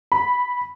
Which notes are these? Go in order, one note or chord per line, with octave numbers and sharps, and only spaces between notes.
B5